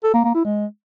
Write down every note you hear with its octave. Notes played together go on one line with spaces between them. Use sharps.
A4
A#3
A#3
E4
G#3